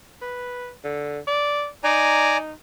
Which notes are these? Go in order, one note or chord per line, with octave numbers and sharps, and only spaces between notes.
B4
D3
D5
D#4 D5 G#5 A#5